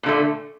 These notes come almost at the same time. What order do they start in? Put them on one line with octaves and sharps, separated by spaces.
A#2 D3 A3